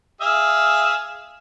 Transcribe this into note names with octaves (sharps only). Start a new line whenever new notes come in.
G#4 E5 F5